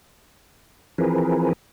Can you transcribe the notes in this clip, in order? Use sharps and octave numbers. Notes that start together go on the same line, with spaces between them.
E3 F3 C4 G#4 A#4 B4